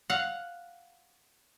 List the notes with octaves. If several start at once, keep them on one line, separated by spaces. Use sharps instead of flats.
F5 F#5